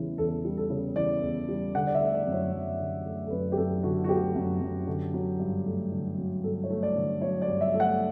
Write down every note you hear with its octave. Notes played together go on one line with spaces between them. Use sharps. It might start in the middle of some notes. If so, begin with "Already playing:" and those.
Already playing: E2 C#3 E3 G3
E2 A4
G3
A4
C#3
E3 D5
E2
G3
D3 F#5
D5
E5
A3
D5
F#2
C#5
F#2
D3
A3
A4
F#2 B4
G4
F#2 A4
D3 F#4
F#4
A3 G4
F#2
F#2
D3
F#3
G2
A3
D3
F#3
G2 A4
C#5
A3
D5
D3
F#3 C#5
D5
G2
E5
A3
F#5